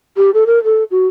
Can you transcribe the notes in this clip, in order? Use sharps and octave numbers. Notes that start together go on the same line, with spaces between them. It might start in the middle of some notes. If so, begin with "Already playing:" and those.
G4
A4
A#4
A4
F#4